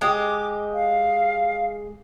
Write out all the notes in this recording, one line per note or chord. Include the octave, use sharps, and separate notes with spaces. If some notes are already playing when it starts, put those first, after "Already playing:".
G#3 G4 D#5 D6
F5